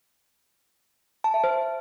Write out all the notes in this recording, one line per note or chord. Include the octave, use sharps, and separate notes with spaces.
A5
E5
C5